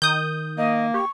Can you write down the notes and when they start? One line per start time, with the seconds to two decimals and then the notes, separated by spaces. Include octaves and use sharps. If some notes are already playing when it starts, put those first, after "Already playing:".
0.02 D#3 D#6 G6
0.58 A#3 D#5
0.94 G4 C#6